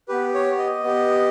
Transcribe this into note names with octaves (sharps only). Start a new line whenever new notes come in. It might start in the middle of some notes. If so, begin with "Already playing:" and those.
B3 G4 B4
C#5
D#5
B3 G4